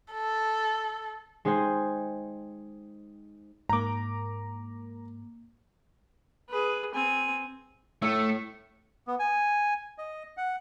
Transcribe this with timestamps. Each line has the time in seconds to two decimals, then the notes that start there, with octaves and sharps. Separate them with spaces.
0.12 A4
1.45 G#3 D#4 G#4 C5 G5 G#5
3.69 G#2 A#3 A#5 D6
6.49 G#4 B4
6.95 C4 G#5
8.02 A2 A3 E5
9.07 B3
9.19 G#5
9.98 D#5
10.37 F#5